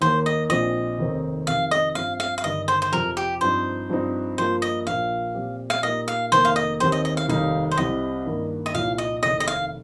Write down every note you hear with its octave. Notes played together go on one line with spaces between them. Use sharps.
D#2 D#3 A#3 C5
D#5
A#1 A#2 F3 C4 D#5
F1 D#2 D#3 C4 D#4
F2 C3 D#3 F5
D#5
G2 F3 C4 F5
F5
F5
G1 G2 D#3 D#5
C5
C5
F2 C3 F3 A#4
G4
G2 F3 C4 D#4 C5
G2 F3 C4 D#4
G2 F3 A#3 F4 C5
D#5
A#1 A#2 F3 A#3 F5
A#2 F3 C4 G4
F5
A#2 A#3 D#4 G4 D#5
F5
F1 F2 D#3 A#3 C5
F5
D#5
D#2 D#3 C4 G4 C5
D#5
D#5
F5
F1 D#2 D#3 G3 D#4 F5
C5
C2 C3 G3 C4 G4 D#5
G2 D#3 A#3
D#5
C2 A#2 F3 D#4 F5
D#5
F1 D#2 D#3 D#5
D#5
F5